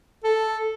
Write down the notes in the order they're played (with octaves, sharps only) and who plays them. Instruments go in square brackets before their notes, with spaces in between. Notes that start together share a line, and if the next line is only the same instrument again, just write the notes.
[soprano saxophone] A4